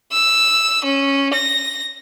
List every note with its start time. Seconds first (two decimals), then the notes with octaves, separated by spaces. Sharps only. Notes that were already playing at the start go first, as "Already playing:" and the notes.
0.12 E6
0.84 C#4
1.33 A#6